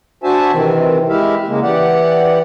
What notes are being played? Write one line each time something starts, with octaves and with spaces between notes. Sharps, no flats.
D4 F#4 C5 E5 G#5 A5
C3 D#3 E3 C4
G#3 E4 G4 E5 F5
C#3 G#3 A#3
E3 G4 D5 F#5